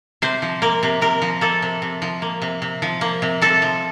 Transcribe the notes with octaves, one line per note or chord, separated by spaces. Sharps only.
C3 C5
F3
A#3 A#4
C3
C3 A#4
F3
A#3 A4
C3
C3
F3
A#3
C3
C3
F3
A#3
C3
C3 A4
F3